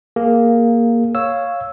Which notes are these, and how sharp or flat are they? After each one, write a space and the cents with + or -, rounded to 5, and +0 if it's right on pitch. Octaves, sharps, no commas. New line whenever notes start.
A#3 +0 G#4 +15
C#5 +0 F5 +0 E6 +0